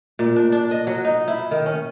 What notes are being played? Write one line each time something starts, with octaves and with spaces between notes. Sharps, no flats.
A#2
D4
D4
D#5
F#3
D#4
E4
D#3
C#4